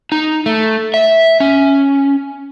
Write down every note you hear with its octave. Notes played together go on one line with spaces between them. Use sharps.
D#4
A3
E5
C#4